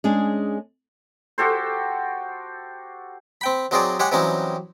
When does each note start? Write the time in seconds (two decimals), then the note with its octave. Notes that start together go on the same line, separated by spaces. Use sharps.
0.04 G#3 C#4 D4 G#4
1.38 F#4 G4 A4 C5
3.41 C4 G5 B5
3.71 F#3 C4 D#4 G#4 C5 D5
3.99 G#3 G4 G#4 C#5 F#5
4.12 E3 F#3 G3 C4 C#4 D#4